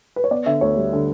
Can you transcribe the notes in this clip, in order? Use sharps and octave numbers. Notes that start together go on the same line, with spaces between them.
B4
C#5
B3 D5
D3 E5
D2 C#5
G3
D3